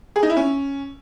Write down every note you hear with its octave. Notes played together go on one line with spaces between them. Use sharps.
G#4
D#4
E4
C#4